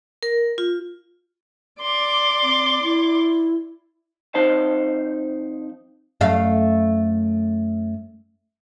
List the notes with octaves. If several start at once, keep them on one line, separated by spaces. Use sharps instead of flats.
A#4
F4
D5 C6 D6
C4
E4
F2 D#4 C5 A5
F#2 A3 F5